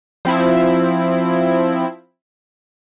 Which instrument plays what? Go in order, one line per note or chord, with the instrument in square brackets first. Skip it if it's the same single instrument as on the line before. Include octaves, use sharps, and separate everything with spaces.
[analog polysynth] F3 C4 E4